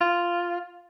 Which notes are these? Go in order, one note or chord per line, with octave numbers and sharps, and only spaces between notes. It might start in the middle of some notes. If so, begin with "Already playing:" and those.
F4